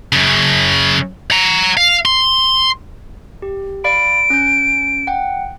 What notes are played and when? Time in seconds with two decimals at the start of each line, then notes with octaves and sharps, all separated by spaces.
0.13 F#2 C#3
1.31 F#5 A#5
1.77 F5
2.05 C6
3.42 G4
3.84 D5 F5 B5 D7
4.30 C#4 G6
5.07 F#5 G5